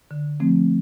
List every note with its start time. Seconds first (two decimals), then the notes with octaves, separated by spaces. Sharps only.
0.11 D3
0.40 F3 A3 C4